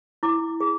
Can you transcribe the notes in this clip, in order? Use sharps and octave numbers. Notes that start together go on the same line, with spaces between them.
E4 D6
G#4